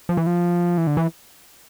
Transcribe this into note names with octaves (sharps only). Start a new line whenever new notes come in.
F3
E3
F3
E3
D3
E3